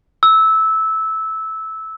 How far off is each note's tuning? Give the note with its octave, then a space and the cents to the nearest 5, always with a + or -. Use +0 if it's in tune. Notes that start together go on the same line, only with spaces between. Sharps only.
E6 -15